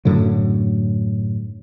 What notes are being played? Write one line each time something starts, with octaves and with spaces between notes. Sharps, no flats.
F#2 A2 D3 F#3